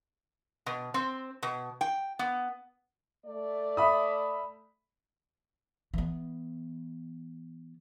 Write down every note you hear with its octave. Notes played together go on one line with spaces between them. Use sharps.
B2
C4
B2
G5
B3
A3 D5
E5 B5 D#6
E3 B3